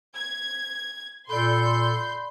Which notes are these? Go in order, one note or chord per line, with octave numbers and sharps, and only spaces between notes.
G#6
A#2 A4 D5 B5 C6 G6